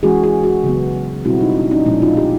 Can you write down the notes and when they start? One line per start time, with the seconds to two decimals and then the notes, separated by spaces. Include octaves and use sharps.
0.03 E3 G#3 C#4 F#4 G#4
0.23 F#4 G#4
0.43 F#4 G#4
0.64 C#3 F#3 B3
1.25 B2 G3 C4 E4 F#4
1.40 D#4 F4
1.56 D4 E4
1.71 C#4 D#4
1.86 A#2 F3 G#3 C#4 D4 E4
2.02 D#4 F4
2.17 F4 G4